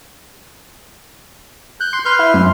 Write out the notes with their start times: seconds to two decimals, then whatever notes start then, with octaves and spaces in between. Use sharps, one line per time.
1.80 F#6 G6
1.93 C6
2.05 B4 C6 F6 G6
2.19 E4
2.34 F#2